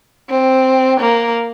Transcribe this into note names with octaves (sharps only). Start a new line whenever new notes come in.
C4
A#3